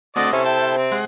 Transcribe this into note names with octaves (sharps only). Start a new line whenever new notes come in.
D3 A3 C4 F#4 D5 D#5
C3 C#4 E4 A4 C5
G5 A5
C4
G#3 F#5 C6